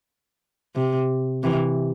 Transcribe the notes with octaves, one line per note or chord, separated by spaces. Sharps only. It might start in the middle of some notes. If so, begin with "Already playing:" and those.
C3
C3 E3